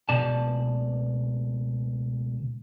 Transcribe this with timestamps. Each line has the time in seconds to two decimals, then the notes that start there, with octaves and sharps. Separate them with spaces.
0.09 C#2 B2 D5 A5